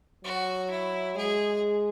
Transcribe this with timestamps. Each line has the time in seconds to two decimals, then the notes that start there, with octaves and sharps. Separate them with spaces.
0.24 F#3 F#4
0.71 E4
1.17 G#3 G#4